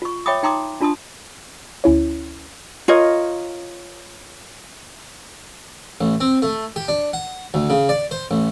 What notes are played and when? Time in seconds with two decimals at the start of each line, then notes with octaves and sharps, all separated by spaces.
0.02 F4 C#6
0.26 C#5 E5 G5 B5 D6 D#6
0.43 D#4 G5 A#5 C6 D6 D#6
0.81 D4 F4 A5 C6 D#6
1.84 D2 C#4 E4 C#5
2.88 F4 A#4 C#5 D#5
6.01 A1
6.21 C4
6.42 A3
6.76 G4
6.88 D4
7.13 F#5
7.54 D2
7.70 C#3
7.89 D5
8.11 C5
8.31 A1